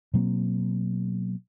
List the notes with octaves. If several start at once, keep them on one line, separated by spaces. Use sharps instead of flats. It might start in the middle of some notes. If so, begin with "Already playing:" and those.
B2 F#3 A#3 C4